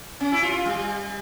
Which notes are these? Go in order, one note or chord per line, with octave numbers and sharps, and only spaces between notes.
C#4
E4
F4
G3